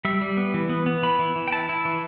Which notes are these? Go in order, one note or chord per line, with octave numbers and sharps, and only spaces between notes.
G3 E5
G3
B3
E3
B3
B3
E3 B5
E3
E3
G5
E4 A5
E4
E3